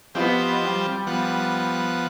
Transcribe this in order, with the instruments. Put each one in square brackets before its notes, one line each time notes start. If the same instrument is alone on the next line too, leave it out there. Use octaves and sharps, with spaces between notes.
[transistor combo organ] F3 C4 G4 [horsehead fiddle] B3 D#5
[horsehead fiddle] G3
[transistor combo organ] F3 B3 F#5